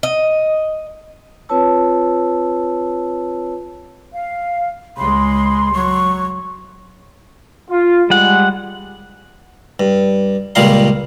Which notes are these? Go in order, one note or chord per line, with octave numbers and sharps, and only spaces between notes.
D#5
C4 F4 B4 C#5 A5 E6
F5
C#2 G#3 B5 C6
F#3 C#6
F4
G3 G#3 F#5
G2
C#2 A#2 G3 F5 A#5 C6